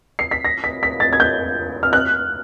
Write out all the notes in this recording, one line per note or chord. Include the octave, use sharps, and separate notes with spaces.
C7
B6
A#6
B6
B6
A6
G#6
G6
F6
F#6